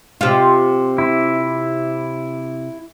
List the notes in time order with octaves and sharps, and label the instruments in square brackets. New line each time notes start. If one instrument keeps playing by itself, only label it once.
[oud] C3 F4
[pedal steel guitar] E4